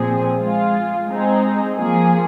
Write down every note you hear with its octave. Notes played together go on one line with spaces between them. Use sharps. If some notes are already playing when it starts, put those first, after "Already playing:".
Already playing: A#2 F3 C4 G#4
G#3 F4 G#4
G#3 C4 D#4 G#4
F3 A#3 G#4